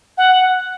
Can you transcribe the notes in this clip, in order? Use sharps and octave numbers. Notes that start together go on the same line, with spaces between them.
F#5